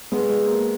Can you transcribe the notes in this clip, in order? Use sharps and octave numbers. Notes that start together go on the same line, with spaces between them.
G#3 B3
G#3
A#3